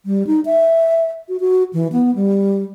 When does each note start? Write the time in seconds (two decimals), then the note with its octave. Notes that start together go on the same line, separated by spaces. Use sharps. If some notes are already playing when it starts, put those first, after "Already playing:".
0.06 G3
0.27 D#4
0.45 E5
1.29 F#4
1.40 F#4
1.73 E3
1.92 B3
2.15 G3